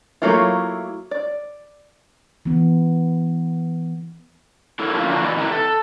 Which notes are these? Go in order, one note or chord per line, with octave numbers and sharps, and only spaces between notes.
F#3 A3 A#3 E4 F4
D5
E3 B3
D4 E4 A4 A#4 C#5
A2 F3 A#3 C#4 E4 F4
A#2 D3 F3 A#3 D4 F#4
E3 E4 B4 D5 D#5
C3 D#3 E4 A#4 B4
A4